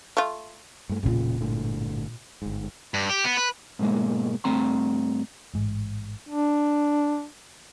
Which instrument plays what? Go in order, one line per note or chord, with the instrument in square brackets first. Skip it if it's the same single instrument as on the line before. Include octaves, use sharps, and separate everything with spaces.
[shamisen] A3 F4
[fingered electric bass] G2 A3
[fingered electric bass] E1 A#1 C#3 [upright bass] A#2 F4
[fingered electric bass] G1 A2 D3
G1 G#2
[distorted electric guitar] G2
G4
B3
B4
[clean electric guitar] G#2 B2 D#3 G#3 A#3
G2 A3 C4 A#5 C6
[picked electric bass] A1 G#2
[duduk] D4